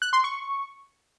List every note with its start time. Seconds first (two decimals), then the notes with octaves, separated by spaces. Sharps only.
0.02 F#6
0.13 C6
0.24 C#6